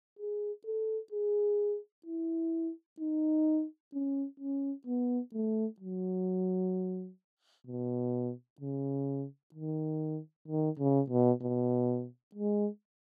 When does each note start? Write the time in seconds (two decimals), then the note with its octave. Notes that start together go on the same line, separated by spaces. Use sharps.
0.19 G#4
0.66 A4
1.12 G#4
2.06 E4
3.00 D#4
3.93 C#4
4.40 C#4
4.87 B3
5.33 A3
5.80 F#3
7.67 B2
8.61 C#3
9.54 D#3
10.48 D#3
10.79 C#3
11.10 B2
11.42 B2
12.35 G#3